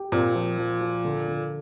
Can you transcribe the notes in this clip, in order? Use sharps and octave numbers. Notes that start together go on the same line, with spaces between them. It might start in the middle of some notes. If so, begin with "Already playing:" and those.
Already playing: G4
A#2 C4
F3
F3
F3
D3
D3